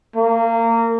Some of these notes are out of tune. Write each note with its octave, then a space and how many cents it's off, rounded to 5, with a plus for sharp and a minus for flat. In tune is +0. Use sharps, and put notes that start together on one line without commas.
A#3 -25